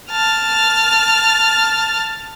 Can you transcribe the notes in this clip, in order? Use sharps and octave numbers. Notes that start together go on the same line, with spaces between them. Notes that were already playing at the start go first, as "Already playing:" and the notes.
A5 F6